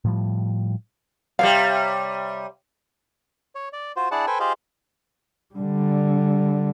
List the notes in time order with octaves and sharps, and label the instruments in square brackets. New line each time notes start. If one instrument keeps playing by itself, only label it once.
[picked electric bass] A2 F3 G3
[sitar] C3 G3 [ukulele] G4 C#5 F5
[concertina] C#5
D5
F4 F#4 C5
D4 E4 G#4 D5 F#5 A5
A4 B4 C5 G5 G#5
F4 G4 G#4 C5 D#5 F5
[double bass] D3 G3